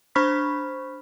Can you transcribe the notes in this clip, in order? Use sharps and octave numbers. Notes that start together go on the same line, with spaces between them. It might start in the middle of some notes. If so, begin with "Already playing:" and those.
D4 C5 B5 C#6 F6 B6